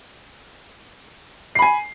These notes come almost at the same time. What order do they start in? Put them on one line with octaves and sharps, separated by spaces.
C7 B5 G#5